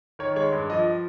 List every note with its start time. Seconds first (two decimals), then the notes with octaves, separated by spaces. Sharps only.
0.19 D#3 C#5
0.36 G#3 C#5
0.52 G2
0.70 F3 D#5